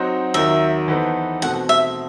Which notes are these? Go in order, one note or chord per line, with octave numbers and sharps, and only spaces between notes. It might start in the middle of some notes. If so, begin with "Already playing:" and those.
Already playing: F#3 C4 D#4 F#4 C5
D#2 D#3 F#3 E5
E3 B3 D#4 A4 C5
B2 A3 C4 F#5
E5